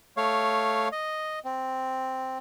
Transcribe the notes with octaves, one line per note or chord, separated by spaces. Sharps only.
A3 C#5 F5
D#5
C4